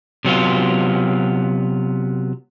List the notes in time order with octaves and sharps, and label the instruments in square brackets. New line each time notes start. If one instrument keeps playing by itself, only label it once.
[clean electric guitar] C3 F#3 B3 F4